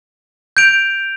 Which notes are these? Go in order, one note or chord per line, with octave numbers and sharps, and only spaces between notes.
G6 D7 F7